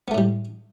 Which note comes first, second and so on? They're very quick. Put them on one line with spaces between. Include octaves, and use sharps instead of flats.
B3 A3 A2 G3